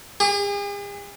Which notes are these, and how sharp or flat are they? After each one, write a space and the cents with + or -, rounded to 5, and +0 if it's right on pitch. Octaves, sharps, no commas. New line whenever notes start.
G#4 -45